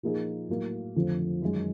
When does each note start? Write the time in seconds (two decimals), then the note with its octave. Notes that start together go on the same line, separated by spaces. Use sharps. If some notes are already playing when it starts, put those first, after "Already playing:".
0.03 A#2 F3 A#3 D#4 G#4
0.49 A2 F#3 A#3
0.95 F2 D3 F3 A3
1.42 F#2 D#3 G#3